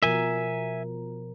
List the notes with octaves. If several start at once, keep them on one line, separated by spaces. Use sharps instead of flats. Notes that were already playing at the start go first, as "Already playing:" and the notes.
B2 F3 A#4 E5 G#5